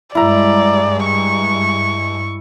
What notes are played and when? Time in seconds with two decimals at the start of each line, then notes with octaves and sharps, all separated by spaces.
0.15 G2 G#3 E4 D5 A#5
1.05 C#6